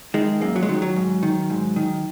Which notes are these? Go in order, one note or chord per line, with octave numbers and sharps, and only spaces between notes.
D#3 G#3
F#2 A#3
F#3
G#3
D#3 F#3
F#3
G#2
D#3
G#2
D#3